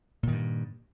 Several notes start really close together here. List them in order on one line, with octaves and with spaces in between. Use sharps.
A#2 D#3 G2